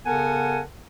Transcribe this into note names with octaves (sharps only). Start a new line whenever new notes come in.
C#3 B3 A4 A#4 F#5 G#5